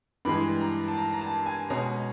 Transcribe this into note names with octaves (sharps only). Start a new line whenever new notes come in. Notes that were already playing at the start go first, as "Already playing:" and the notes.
G2 E3 G#3 B5
A#5
A5
A#5
A#5
A5
G#5
B2 G#3 C#4 A#5